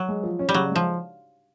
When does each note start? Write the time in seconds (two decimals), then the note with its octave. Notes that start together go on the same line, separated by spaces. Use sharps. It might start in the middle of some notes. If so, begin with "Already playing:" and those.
Already playing: F#3
0.08 G#3
0.23 F3
0.39 C#4
0.49 G3
0.54 C#3 F#3
0.71 F3 G#3